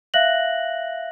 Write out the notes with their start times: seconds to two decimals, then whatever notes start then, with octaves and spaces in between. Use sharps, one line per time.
0.14 E5 F5 F#6 A#6 F#7